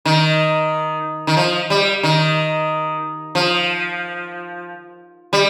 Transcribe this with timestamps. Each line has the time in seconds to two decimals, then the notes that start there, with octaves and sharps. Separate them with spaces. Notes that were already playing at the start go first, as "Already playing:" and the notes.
0.05 D#3
1.27 D#3
1.37 F3
1.70 G3
2.03 D#3
3.35 F3
5.33 G3